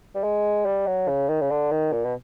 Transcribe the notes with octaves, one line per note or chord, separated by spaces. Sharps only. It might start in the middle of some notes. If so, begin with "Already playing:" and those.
G3
G#3
G3
F#3
C#3
D#3
C#3
D3
D#3
A#2
B2